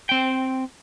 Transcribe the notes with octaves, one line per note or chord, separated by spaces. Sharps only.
C4 G5